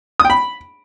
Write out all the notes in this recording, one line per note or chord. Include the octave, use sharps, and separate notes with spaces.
D#6
G5
B5